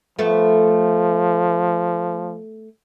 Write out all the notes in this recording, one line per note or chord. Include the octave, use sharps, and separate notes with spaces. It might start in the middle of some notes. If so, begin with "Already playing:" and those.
F3 A3 B3